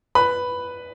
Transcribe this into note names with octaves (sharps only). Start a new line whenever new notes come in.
B4 B5